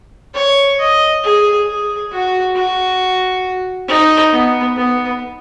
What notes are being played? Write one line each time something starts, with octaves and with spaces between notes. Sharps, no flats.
C#5
D#5
G#4
G#4
F#4
F#4
D#4
B3
B3